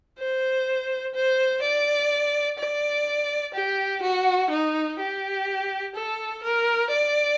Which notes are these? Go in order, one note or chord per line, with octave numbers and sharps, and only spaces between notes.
C5
C5
D5
D5
G4
F#4
D#4
G4
A4
A#4
D5